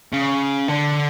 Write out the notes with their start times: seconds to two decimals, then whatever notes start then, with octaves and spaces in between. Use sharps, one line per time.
0.13 C#3
0.68 D3